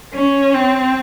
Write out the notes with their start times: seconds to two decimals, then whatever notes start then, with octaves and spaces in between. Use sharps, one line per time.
0.14 C#4
0.54 C4